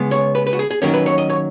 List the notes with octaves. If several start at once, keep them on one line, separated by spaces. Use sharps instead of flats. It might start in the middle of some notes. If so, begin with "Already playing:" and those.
Already playing: C#3 G#3 B3
C#5
B4
B4
F#4
G#4
G#4
D#3 F#3 A#3 C#4 A#4
B4
C#5
D#5
C#5